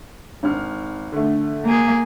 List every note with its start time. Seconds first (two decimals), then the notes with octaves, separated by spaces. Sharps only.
0.43 G#1 F6
1.12 D3 A3
1.64 A#3 G#4